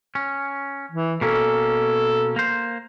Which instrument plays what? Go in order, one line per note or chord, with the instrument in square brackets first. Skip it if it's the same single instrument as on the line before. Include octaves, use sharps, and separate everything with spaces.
[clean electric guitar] C#4
[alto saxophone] E3
[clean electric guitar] B2 A#3 C#4 [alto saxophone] A4
[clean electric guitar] A#3 C5